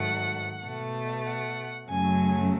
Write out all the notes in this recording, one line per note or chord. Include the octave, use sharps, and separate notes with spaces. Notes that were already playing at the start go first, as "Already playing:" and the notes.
Already playing: G#2 D#3 F#3 A3 F#5
B2 A3
F#5
F#2 C#3 F#3 A3 G#5